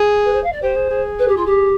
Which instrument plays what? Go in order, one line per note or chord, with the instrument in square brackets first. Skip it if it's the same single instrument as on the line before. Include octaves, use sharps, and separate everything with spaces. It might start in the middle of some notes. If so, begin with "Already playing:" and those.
Already playing: [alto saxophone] G#4
[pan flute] B4
C5
F5
D5
[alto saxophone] G4 [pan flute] C5
[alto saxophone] G#4
G#4
[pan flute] B4
G4
F4
G4